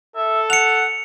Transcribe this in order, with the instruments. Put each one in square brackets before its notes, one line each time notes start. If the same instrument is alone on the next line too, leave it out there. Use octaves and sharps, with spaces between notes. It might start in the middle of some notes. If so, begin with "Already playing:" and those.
[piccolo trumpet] A4 [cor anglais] E5
[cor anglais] F#5 [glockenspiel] C#7 F7